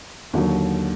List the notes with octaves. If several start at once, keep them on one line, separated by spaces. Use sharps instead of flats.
D#2 D3 F#3